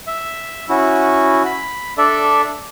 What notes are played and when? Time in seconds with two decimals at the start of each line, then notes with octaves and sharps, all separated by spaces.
0.07 E5
0.69 C#4 E4 F#4
1.45 B5
1.98 D4 A4 D5 E5